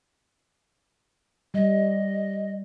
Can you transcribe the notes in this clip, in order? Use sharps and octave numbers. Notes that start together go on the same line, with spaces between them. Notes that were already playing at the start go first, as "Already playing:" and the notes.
G3 D#5